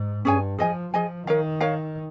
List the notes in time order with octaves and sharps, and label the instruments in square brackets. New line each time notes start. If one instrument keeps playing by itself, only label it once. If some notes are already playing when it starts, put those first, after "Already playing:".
Already playing: [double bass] G#2
[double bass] G2 [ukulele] C#4 G#4 C#5 G#5
[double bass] F3 [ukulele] G#4 D#5 G#5
[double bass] F3 [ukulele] G#4 D#5 G#5
[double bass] D#3 [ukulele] A#4 C#5 F5
[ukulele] A#4 C#5 F5